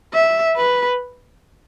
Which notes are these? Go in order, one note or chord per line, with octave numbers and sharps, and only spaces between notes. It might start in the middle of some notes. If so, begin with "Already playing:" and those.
E5
B4